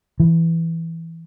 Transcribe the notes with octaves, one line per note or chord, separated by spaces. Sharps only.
E3